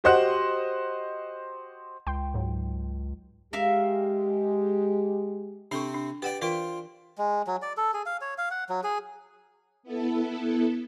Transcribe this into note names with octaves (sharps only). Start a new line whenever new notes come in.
F#4 G4 C5 D#5 F#5 F#6
C#2 G5 C6
G#2 F#3
G#3 G4 A#4 E5 F5
C3 C4 D4 A4 C5 C#6
D4
G4 B4 D5 F#5
E3 F4 A#4 C5 D5 G5
G#3
F#3
D5
A4
G#4
F5
C#5
F5
F#5
F#3
G#4
B3 E4 A4